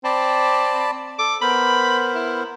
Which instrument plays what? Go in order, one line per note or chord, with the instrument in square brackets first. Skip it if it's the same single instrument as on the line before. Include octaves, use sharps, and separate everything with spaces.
[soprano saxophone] C4 [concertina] D5 A5 B5
[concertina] A4 [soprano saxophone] D6
[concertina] B3 A#4 C5 [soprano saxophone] B5
[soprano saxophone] E4